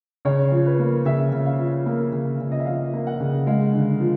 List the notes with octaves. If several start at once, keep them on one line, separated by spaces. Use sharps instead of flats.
C#3 C#5
F3
B4
A#3
C#3 E5
C#3
F5
F3
A#3
C#3
C#3
D#5
E5
F3 F5
A#3
F#5
C#3
G#3 F5
D3
F3